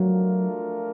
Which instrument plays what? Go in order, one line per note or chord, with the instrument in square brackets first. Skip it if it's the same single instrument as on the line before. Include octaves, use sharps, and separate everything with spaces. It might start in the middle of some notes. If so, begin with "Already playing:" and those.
Already playing: [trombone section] F3 A3 D4 F4 A#4 [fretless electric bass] F#3